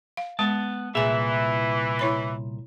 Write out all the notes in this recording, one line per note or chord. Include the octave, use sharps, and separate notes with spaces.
F5
G#3 B3 A5
C2 A#2 E3 G#4 E5 G#5
E4 C#5 B5